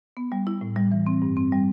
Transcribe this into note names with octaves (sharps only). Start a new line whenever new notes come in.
B3
G3
E4
A2
G3
E3
C4
G2
C4
G3